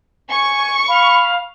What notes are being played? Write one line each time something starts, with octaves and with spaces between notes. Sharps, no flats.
G#5 C#6
F5 B5